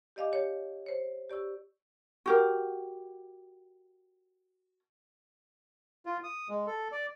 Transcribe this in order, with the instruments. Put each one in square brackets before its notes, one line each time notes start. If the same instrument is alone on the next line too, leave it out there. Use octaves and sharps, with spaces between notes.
[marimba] G4 D5 D#5 F5 G#5 D6
G4 C#5
C5 C#5
G4 D5 C#6 E6
[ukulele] F#4 G4 A#4
[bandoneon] F4
D#6
G#3
A4
D5